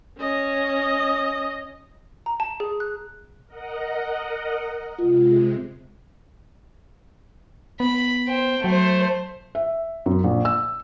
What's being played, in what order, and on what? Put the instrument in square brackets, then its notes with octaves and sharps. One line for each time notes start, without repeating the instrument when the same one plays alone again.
[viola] C#4 D#5
[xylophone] A#5
A5
G#4
F#6
[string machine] A#4 D#5 F#5
[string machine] C3 G#3 [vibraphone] F4
[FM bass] B3 [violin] B5
[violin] C5 G5
[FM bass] F#3 [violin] A3 C5
[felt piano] E5
F#2
A#1
E6